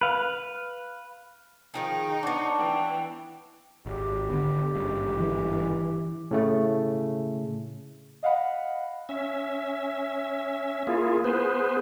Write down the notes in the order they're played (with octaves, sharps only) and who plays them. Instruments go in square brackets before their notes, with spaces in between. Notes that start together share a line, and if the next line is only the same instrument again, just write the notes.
[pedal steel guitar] B4 F5
[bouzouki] D#3 F3 G#4 [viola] D#4 [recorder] G5
[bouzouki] B3 C#5 [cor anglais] D4 [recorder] F#5
[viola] E3 [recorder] G5
[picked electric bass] G#1 [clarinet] G4
[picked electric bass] D3 B3
G#1 G2 C#3
[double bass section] E3
[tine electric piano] A2 C#3 A3
[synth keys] D#5 F5 F#5 B5
[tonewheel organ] C#4 E5
A#3 E4 F4 G#4
B3 G#4 B4 C5